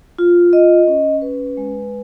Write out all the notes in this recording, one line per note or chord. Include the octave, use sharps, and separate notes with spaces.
F4
D#5
C#4
B4
G#3